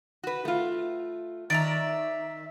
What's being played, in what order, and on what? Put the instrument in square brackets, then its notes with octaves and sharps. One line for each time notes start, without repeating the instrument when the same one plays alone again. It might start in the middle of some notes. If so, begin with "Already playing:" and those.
[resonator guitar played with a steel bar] F#4 B4
A3 F4
[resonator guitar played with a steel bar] D#3 [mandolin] D5 E5 A#5